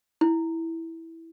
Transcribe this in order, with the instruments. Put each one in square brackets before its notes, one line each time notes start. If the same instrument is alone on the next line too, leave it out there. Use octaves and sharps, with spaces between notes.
[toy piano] E4